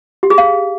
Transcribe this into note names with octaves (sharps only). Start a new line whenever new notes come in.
G4
G#4
F5